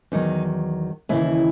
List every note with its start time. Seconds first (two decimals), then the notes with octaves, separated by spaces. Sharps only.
0.12 E2 D#3 F#3 D#4
1.09 D#2 C#3 E3 E4